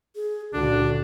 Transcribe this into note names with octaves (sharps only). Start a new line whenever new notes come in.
G#4
C#2 A#2 D3 D4 F#4